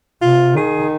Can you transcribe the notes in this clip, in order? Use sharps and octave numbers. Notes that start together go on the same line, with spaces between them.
C3 F4
D#3 G#4